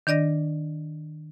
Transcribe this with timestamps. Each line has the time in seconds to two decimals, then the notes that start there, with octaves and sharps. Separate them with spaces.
0.07 D#3 D4 D5 D#5 A#6